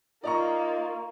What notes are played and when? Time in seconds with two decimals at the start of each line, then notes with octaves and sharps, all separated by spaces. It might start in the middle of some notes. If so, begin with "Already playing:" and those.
0.24 A#3 D#4 F4 D5 A#5 C#6